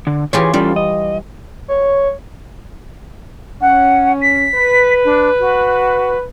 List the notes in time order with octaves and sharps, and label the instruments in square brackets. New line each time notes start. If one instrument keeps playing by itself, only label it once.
[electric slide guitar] D3
[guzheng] E3 F4 G4 [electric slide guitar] G#4 C#5
[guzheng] G3 [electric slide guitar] C#4 F4 A4
[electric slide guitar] D#5
[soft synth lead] C#5
[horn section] C#4 [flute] F#5
[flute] B6
[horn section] B4
[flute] D4
F#4